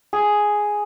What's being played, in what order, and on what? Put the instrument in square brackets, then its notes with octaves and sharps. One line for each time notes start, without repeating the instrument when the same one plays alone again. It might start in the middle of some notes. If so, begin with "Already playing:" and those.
[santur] G#4